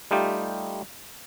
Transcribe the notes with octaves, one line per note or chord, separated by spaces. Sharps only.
G3 A3 D#4 F4 G4